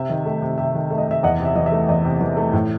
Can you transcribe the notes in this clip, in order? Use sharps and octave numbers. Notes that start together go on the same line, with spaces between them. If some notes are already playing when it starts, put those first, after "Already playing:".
Already playing: C3 E5
D#3
A3
C3
C3 E5
D#3
A3
D#5
C3 E5
E2 D#5 F#5
C3
E5
E3 D#5
E5
A3
E2 D#5
C3
E3
A3
A2